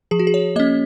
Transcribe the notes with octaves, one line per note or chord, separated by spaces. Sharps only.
F3 G#4
F#4
G#4
C#5
A#3 C#4 D#5